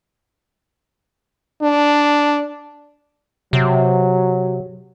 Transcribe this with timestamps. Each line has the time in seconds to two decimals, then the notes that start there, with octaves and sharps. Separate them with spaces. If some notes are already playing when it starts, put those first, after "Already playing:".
1.62 D4
3.53 C3 F#3